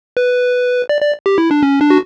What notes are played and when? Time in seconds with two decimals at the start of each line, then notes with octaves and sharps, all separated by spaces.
0.17 B4
0.89 D5
1.01 D5
1.26 G4
1.38 E4
1.51 D4
1.63 C#4
1.81 D4
1.90 F#4